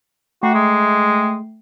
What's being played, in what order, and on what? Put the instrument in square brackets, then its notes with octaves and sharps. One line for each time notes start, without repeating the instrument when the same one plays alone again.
[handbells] A3 G5 C7 [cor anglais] F#4
[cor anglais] G#3